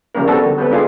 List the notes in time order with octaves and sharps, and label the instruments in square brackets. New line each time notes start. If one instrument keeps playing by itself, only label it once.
[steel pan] C#3 F3 G3 A#3 C#4 A#4
G3 B3 C4 D4 F#4 A4
D3
G3 B3 C4 A4 B4
G#3 D4 F4 G#4